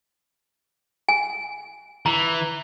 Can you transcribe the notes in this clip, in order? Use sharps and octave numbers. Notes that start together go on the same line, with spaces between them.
G#5
E3 A#5